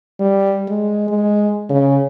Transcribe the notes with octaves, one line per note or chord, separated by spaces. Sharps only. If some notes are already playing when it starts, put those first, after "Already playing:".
G3
G#3
G#3
C#3